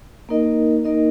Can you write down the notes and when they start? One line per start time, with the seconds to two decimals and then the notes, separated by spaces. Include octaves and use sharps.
0.29 A#3 D#4 A#4 D#5
0.84 A#3 D#4 A#4 D#5